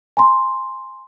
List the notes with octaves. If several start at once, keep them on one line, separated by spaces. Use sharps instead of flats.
G#5 A#5 C6